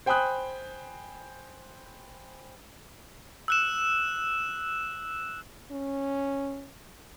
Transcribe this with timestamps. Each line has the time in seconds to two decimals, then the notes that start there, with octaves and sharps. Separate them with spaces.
0.06 C5 G5 G#5 B5 D#6 F#6
3.48 E6 F#6 E7
5.71 C#4